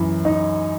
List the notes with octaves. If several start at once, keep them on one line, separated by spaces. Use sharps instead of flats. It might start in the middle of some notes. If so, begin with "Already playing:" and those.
Already playing: F#2 E3
D#4